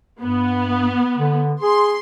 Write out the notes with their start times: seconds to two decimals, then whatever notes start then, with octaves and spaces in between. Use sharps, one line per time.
0.21 G2 B3
1.17 D3
1.62 G#4 C6